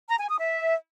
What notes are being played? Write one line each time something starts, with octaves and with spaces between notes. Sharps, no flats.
A#5
G#5
D#6
E5